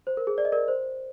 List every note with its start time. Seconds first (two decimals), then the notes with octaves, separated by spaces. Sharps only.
0.07 C5
0.17 A#4
0.27 G#4
0.38 D5
0.45 D#5
0.52 A#4 D5
0.68 C5